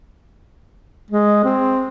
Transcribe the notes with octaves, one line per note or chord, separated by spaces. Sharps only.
G#3
C4